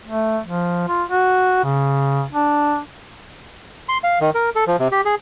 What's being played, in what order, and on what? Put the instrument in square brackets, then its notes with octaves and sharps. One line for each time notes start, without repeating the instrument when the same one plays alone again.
[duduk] A3
F3
F4
F#4
C#3
D4
[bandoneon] C6
F5
D#3
A#4
A4
F3
C3
G4
G#4